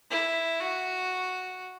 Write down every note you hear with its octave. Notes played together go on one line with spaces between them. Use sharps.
E4
F#4